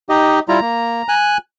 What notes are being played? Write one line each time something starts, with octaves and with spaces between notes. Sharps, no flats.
D#4 G4 D#5
G3 E4 F4 A#5
A#3
G#5 F#6